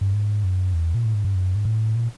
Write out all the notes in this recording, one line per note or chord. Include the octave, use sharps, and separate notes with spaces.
G2
G#2
F#2
E2
A#2
A2
G#2
G2
F#2
G#2
A2
A#2